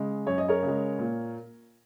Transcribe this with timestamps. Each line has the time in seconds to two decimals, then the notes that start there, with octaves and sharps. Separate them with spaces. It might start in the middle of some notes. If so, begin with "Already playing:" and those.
Already playing: C#3 G#3
0.27 F#2 C#5
0.38 D#5
0.48 A#4 C#5
0.62 C#3
0.68 G#3
0.99 A#2